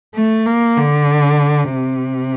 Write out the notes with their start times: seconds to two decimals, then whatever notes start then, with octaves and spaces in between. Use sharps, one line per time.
0.15 A3
0.46 A#3
0.77 D3
1.72 C3